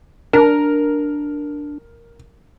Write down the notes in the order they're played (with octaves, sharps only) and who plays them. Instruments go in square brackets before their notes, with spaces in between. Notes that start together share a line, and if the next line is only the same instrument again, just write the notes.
[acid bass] D4 [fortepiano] A#4